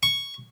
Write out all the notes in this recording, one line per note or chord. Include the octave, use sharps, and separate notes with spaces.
C#6